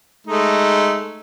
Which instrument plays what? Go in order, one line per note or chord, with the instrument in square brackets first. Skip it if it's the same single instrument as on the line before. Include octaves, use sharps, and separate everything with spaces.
[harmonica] G#3 A3 D#4